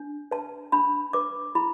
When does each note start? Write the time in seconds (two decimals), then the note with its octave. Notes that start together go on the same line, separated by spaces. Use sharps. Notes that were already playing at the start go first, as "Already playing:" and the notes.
Already playing: D4
0.31 B4 A5
0.72 D4 B5
1.13 B4 D6
1.55 E4 B5